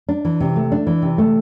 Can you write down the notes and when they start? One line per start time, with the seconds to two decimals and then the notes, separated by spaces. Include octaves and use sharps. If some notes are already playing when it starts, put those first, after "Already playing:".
0.09 D4
0.25 E3
0.40 C3
0.56 A3
0.72 D4
0.87 E3
1.02 C3
1.18 A3